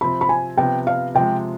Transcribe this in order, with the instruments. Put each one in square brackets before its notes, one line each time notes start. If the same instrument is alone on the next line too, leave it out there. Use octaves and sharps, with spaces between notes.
[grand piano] C3 F3 C4 [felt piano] B5
[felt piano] B5
G#5
[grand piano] C3 F3 B3 [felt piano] G5
[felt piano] F5
[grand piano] C3 F3 G#3 [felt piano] G5